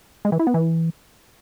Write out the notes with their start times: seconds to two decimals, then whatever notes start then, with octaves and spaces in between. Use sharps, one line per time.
0.25 G#3
0.32 E3
0.39 E4
0.47 B3
0.54 E3